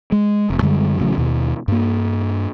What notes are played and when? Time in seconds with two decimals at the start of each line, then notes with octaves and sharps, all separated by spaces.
0.12 G#3
0.50 F1
0.62 F#2 D3 G3 G#3
0.99 A1 C#3 F3 F#3
1.18 D#2 B2
1.68 G2 A#3